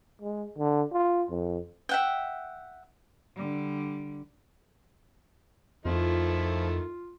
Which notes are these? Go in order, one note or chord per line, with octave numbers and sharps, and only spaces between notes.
G#3
D3
F4
F2
E5 F#5 G5
D3 G3
F2 D#3 F3 A3 E4 F4